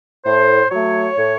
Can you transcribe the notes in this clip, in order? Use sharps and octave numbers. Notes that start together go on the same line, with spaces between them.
A2 C5
F#3 A3 C#5
A2